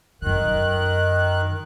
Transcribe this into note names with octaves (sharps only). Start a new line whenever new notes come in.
F#2 D3 D#3 F#6